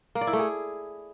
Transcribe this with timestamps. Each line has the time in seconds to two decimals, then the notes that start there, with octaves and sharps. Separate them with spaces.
0.15 A#3
0.21 D5
0.27 E4
0.33 A3
0.39 G#4